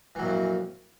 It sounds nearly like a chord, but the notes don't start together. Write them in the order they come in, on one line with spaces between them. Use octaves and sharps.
E3 F#3 A#2 F2